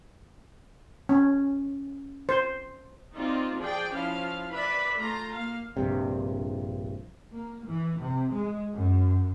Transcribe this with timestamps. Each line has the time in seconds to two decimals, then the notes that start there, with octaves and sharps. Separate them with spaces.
1.09 C#4
2.29 C5
3.16 C4 D#4 F4 D5
3.59 F3 G#4 D5 G5
3.93 F3 C#4 E4 F5
4.52 B4 D5 E5 B5
5.00 A3 F4 A#5 C6
5.32 A#3 F5
5.77 A#1 G2 C3
7.33 A#3
7.69 E3
8.02 C3
8.34 G#3
8.73 F#2